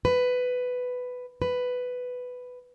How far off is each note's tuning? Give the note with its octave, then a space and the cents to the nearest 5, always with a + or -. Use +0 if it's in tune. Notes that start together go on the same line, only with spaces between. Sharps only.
B4 +10
B4 +10